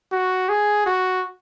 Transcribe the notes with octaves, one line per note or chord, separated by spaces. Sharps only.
F#4
G#4
F#4